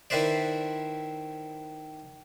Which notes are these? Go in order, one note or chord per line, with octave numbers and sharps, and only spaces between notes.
D#3 E4 B4 C5 D5